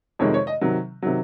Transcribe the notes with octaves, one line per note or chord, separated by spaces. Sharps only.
F2 C3 D#3 G#3 C#5
C#5
D#5
C3 D#3 F#3
C3 D#3 F#3